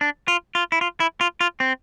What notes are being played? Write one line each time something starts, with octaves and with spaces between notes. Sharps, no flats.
D4
F4
F4
E4
F4
E4
F4
F4
C4